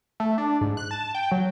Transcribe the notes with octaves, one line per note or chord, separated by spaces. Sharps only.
A3
D4
G#2
F#6
A5
G5
F#3